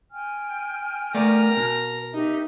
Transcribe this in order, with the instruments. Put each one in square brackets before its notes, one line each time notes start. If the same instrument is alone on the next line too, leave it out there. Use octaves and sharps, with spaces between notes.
[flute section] G5 G#5 F6
[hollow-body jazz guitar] A3 B3 D5 [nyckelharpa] A#4 A#5
[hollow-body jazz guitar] B2
[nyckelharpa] D#4 [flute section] G4 E5